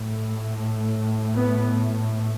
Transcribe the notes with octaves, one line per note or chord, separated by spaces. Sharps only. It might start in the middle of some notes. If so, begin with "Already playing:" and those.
Already playing: A2
B3